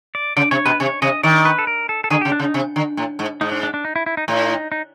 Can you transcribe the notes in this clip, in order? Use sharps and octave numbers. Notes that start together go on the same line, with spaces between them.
D5
C#3 D5
C3 C#5
B2 B4
C3 C#5
C3 D#5
D#3 D5
B4
A4
A#4
A4
A4
D3 G#4
C#3 G4
D4
C#3
D#4
C3
D3
A2
G#2
G#2 D#4
D4
D4
D4
D#4
E4
E4
D#4
A2 D#4
D#4